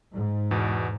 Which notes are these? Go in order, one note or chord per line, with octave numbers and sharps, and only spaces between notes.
G#2
E2 B2